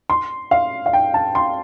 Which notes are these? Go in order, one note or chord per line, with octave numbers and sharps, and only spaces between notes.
C6
F5
F5
G5
A5
C6